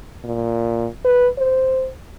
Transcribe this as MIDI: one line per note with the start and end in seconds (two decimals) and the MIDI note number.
0.24 0.88 46
1.05 1.28 71
1.38 1.89 72